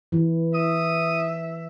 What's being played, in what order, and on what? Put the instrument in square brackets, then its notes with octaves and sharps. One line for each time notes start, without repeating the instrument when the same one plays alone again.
[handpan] E3
[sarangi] E5 [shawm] D#6